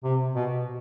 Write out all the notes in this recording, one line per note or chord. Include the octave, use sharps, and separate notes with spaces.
C3
B2